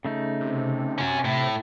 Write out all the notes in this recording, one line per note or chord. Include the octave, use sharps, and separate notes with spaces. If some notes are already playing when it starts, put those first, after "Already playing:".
C#3 A3 D#4
C3
C#4 F#4
A2